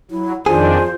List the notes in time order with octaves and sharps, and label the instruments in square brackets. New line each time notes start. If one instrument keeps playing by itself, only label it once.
[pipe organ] F#3 [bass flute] E4
[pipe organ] F2 D#3 D4 [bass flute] F4 [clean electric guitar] G#4 [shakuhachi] C5